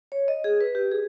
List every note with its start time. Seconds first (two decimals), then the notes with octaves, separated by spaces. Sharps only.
0.12 C#5
0.28 D#5
0.44 G#4
0.61 B4
0.75 G4
0.92 G#4